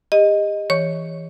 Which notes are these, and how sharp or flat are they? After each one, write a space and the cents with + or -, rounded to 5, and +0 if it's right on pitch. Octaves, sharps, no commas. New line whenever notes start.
G4 +40 D#5 +0
E3 +0 C#5 +0 C#6 +0